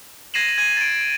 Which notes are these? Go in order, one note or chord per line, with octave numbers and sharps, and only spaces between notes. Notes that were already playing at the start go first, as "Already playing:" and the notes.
G#6 A#6 C7 D#7 E7 F#7
G#6 D#7
A6 D7